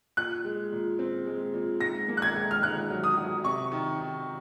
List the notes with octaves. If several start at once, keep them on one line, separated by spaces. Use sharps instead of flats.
A#2 F#6
G#3
A#2
C4
G#3
A#2
G#2 A#6
A#3
F#6
G#6
G#2
F6
G#2 F#6
F#3
D#6
F#3
C3 C#6
D#3
D#3